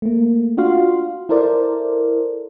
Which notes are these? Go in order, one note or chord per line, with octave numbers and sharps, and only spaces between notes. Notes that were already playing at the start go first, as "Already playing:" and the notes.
A3 A#3
D4 F4 F#4 F5 C6
E4 A4 A#4 C5 D5